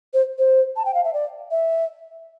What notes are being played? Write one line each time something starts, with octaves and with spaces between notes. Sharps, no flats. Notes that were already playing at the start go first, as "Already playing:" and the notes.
C5
C5
A5
G5
F5
E5
D5
E5